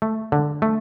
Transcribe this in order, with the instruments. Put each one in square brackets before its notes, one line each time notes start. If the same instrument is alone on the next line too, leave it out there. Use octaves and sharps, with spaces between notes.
[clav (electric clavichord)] A3
D3
A3